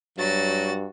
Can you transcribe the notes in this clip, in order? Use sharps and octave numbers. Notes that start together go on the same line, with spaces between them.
G2 F#3 F#4 A6